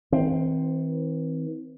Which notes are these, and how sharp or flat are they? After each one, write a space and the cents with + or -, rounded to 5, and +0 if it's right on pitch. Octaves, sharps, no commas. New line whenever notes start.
E3 -45 C4 +0